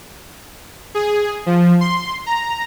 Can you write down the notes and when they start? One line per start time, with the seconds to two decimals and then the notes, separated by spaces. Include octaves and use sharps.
0.95 G#4
1.46 F3
1.81 C6
2.26 A#5